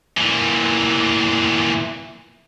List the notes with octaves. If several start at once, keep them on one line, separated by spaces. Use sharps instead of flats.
A#2 E3